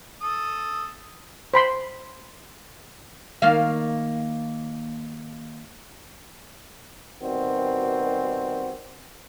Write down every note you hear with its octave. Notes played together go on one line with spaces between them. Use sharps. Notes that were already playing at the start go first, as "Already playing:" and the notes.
A4 D#6
C5 B5 C6
D#3 A#3 F5
B2 D#3 G3 C4 F#4